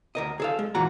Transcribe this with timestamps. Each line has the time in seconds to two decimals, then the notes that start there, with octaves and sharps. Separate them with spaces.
0.15 D2 A#4 D#5
0.40 G#4 A4 F5
0.59 G#3
0.75 A#2 E3 F#4 A#5